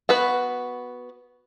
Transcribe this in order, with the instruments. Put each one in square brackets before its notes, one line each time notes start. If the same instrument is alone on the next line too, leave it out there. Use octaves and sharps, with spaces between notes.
[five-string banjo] B3 F#4 B4